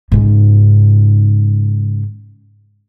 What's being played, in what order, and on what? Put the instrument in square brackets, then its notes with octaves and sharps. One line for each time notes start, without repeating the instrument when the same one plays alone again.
[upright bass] G#2 C#3